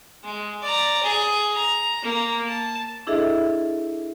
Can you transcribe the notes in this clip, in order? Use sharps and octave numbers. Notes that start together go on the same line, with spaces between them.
G#3
D5 A#5
G#4
A#5
A#3
A5
D4 E4 G#4 A4 D#5 E5